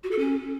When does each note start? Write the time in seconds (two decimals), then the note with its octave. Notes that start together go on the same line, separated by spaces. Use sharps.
0.03 F#4
0.11 A4
0.18 C#4